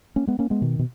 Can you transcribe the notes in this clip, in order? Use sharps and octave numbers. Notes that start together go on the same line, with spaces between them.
A#3 C#4
G#3 B3
A#3 C#4
G#3 B3
B2 D#3
B2